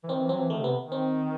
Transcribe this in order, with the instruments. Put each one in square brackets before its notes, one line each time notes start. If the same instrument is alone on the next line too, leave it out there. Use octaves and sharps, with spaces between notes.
[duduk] E3
[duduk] D#3 [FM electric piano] C4
[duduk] E3
[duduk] F#3 [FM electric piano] C4
[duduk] E3
[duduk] D#3 [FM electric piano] A3
[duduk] C3 [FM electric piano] B3
[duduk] D#3
[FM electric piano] C4